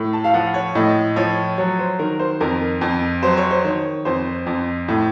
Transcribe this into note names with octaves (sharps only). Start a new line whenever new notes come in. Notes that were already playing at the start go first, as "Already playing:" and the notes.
Already playing: A2
A5
F5
F3 F#5
C#5
A2 D#5
F3 C#5
F#3 C#5
C5
D#3 A#4
C5
F2 A#4
F2
F#3 C5
C#5
C5
D#3 C#5
F2 C5
F2
A2